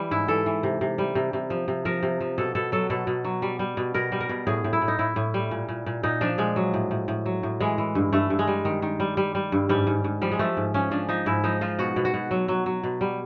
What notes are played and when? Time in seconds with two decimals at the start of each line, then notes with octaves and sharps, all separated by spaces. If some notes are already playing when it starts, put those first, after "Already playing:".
Already playing: E3 G3
0.11 G#2 E4
0.28 E3 A4
0.46 E3
0.63 C3
0.81 C3
0.98 G3
1.15 C3
1.33 C3
1.50 F3
1.68 C3
1.85 F3 A#4
2.03 C3
2.21 F3
2.38 B2 A4
2.55 B2 A4
2.72 F#3 A4
2.90 B2 A4
3.07 B2
3.25 F#3
3.42 G3
3.59 G3
3.77 B2
3.94 B2 A#4
4.12 G3
4.21 A#4
4.29 B2
4.47 A2 G#4
4.64 A2
4.73 E4
4.82 A2
4.88 D#4
4.99 A2 E4
5.16 A2
5.34 G3
5.51 A#2
5.69 A#2
5.86 A#2
6.03 A#2 D#4
6.21 F3 D4
6.38 A#2 G#3
6.56 F#3
6.74 A2
6.91 A2
7.08 A2
7.26 F#3
7.43 A2
7.61 E3 G#3
7.78 E3
7.95 G2
8.12 G2 A3
8.30 G2
8.39 G#3
8.47 G3
8.65 D#3
8.82 D#3
9.00 G3
9.17 G3
9.35 G3
9.52 G2
9.69 G#2 G3
9.87 G#2
10.04 G#2
10.21 F3 G3
10.32 G#3
10.39 F3 A3
10.57 G#2
10.74 F3 C#4
10.91 F3 D4
11.09 F3 D#4
11.26 G#2 E4
11.44 F3 D#4
11.61 F3 F4
11.79 B2 F#4
11.96 B2
12.05 F#4
12.14 B2
12.31 F#3
12.48 F#3
12.66 F#3
12.83 B2
13.01 G3